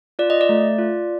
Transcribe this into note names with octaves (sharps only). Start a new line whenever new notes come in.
F4 D5
D#5
D5
A3
F4